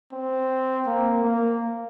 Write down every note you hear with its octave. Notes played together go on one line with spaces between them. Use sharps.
C4
A#3
A#3